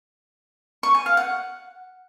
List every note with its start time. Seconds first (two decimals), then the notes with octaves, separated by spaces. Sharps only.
0.83 C#6
0.95 G#5
1.06 F5
1.17 F#5